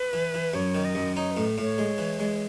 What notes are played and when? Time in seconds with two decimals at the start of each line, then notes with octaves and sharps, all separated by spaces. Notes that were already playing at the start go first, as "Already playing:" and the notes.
Already playing: B4
0.13 E3
0.34 E3
0.54 F#2 C#5
0.75 D#3
0.85 D#5
0.95 F#2
1.15 D#4 C#5
1.31 B4
1.37 A2
1.58 A2 C#5
1.78 G#3
1.98 E3
2.20 G#3